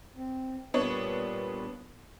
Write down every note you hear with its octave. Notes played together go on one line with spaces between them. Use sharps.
C4
A#2 G3 B3 D4 B4 C#5